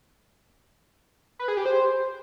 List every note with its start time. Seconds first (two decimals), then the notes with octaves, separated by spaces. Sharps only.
1.39 B4
1.48 G#4
1.57 G4
1.66 C5